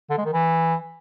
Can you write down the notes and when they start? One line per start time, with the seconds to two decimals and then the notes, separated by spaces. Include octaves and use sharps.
0.10 D3
0.18 G#3
0.25 D#3
0.33 E3